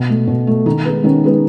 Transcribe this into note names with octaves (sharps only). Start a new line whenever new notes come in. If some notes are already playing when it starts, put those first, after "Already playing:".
Already playing: B2
A3
B2
A3
D#3 D#4
G#3 B3
D#3 C#4
G#3 B3